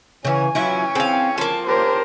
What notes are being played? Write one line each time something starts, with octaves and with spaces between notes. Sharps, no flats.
C#3 E3 C#4 C#5 G#5
E3 F#3 C#4 E4 F4 C#6
C4 G#4 F5
F3 A#3 A5
C#4 G4 A#4 C5 A5